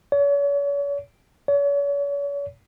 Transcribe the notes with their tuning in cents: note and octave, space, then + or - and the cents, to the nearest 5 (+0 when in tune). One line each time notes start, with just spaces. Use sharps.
C#5 +40
C#5 +40